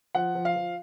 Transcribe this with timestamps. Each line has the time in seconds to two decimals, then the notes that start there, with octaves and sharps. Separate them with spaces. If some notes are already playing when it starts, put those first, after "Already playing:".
0.15 F3 F#5
0.35 F3
0.45 F5
0.56 F3